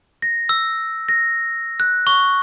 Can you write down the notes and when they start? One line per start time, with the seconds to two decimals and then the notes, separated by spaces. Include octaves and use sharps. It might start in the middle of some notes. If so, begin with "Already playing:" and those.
0.22 A#6
0.49 E6
1.09 A#6
1.80 F#6
2.07 C#6